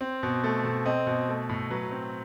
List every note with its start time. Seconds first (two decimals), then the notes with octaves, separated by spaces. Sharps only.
0.01 C4
0.23 B2
0.44 A3
0.64 B2
0.86 C4 D#5
1.07 B2
1.29 A3
1.49 A2
1.70 F#3 B4
1.91 C4